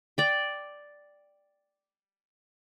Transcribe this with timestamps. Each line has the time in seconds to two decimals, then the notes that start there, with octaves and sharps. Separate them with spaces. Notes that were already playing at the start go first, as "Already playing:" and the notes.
0.18 D5 G5